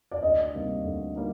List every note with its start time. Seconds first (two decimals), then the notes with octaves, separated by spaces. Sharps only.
0.11 D5
0.22 D2 D#5
0.54 C3 G3 A#3 D#4
0.84 D2
1.16 G3 A#3 D#4